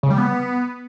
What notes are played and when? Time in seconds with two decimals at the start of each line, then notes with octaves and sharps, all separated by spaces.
0.03 C#3
0.10 G3
0.18 B3